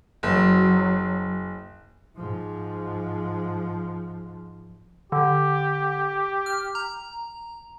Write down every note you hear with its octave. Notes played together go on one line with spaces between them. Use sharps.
F#1 F#3
G#2 F3
D3 G4
F6
A#5